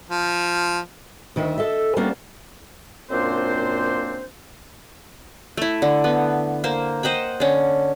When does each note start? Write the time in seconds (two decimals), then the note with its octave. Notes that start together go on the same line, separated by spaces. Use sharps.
0.09 F3
1.36 D2 D#3 D#5 E5
1.58 A4 D#5 E5
1.97 G3 A#3 B3 C#4 D4
3.11 F#2 A#2 A#3 C4 D4 C5
5.57 A3 E4
5.82 D3
6.04 B3
6.64 A#3 C5 C6
7.03 C5 D#5 F#5 G5
7.40 D3 C#4